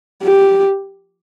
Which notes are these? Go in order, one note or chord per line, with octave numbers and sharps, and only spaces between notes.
G4